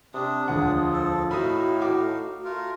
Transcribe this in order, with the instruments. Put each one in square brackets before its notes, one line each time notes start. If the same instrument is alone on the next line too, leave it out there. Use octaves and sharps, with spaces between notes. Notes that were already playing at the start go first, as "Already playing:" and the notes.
[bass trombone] C3 [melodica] D4 [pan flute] D#6
[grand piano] E1 D2 F#5 [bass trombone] F3
[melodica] A4
[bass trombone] A2 [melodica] D#4 F5 [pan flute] F#4 [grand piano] B5 D#6
[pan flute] F#4 [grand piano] F#5 D6
[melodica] A3 F4 A#4